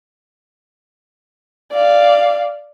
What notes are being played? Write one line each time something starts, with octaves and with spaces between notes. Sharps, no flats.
D5 F5